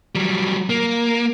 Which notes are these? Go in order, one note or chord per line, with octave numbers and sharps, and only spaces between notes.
F#3 G3
A#3